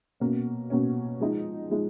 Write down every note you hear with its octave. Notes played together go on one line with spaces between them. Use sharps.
B2 A#3 C#4
B2 A#3 C#4
F3 G#3 D#4
F3 G#3 D#4